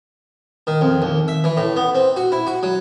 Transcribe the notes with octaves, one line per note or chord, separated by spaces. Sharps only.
D#3
F2
D#2
E5
E3
A2
B3
C4
F#4
E4
F#4
F#3